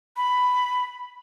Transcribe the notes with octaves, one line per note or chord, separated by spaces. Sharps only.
B5